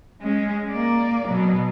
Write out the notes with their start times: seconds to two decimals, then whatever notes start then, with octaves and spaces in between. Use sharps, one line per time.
0.22 G#3 C#4
0.71 A#3 D5
1.27 B2 F#3